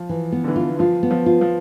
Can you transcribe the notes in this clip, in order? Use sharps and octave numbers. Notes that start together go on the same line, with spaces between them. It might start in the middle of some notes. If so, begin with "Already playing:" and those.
Already playing: F3
E3
B3
D3
E3
F4
F3 F4
B3
F3
F4
F3